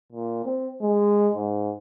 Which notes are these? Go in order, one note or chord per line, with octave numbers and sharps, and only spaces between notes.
A#2
C4
G#3
G#2